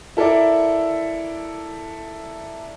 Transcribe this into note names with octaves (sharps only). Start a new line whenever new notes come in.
E4 A4 A#4 D5 E5